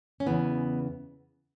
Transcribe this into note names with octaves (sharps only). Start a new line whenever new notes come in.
C#4
E2 C#3 E3 B3